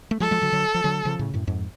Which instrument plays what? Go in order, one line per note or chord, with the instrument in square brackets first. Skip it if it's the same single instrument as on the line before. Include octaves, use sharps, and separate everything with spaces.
[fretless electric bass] A3
[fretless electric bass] F3 G#3 [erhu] A4
[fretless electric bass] F3 G#3
D3 F#3
D3 F#3
F3
D3 F#3
C#3 F3
A2 C#3
F#2 A2
F2 G#2